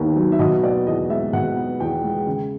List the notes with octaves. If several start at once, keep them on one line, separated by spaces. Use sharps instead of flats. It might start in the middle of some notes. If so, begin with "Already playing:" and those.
Already playing: D#2 D#3 B3
F#3
E5
B2 D#5
B3 D5
E2 D#5
G#3 E5
B2 F#5
B3
E2 G5
G#3
C#3